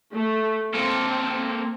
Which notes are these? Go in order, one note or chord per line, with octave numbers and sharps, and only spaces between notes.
A3
A#3 C4 A4